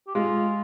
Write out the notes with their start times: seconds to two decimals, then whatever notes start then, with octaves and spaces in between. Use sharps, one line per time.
0.07 G4
0.15 G#3 F4